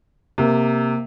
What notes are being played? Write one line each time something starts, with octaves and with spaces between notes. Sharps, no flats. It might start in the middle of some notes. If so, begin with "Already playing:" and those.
C3 A#3